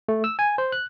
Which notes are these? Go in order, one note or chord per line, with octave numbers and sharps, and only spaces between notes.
A3
E6
G#5
C5
F#6